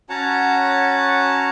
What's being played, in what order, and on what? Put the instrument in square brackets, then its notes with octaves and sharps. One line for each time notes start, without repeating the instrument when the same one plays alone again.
[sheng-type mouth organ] C#4 F#4 C#5 F#5 A5 A#5